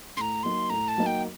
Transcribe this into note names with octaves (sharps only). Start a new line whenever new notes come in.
A2 A#5 C6
F#3 A#3 D#4 C6
A2 A#5
A5
F#3 A#3 D#4
G5